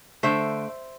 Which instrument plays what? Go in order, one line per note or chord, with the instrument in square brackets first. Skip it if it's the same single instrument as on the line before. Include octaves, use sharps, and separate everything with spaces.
[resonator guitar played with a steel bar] D3 A3 C5 E5